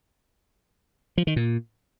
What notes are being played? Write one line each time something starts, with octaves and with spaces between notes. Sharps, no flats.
F3
D#3
A#2